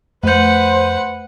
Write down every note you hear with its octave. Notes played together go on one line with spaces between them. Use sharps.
F2 A3 B4 C5 F#5 G6